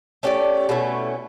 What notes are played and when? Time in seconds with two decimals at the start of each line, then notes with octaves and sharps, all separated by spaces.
0.23 A3 C#4 G4 D5
0.69 B2 A3 C#4 E4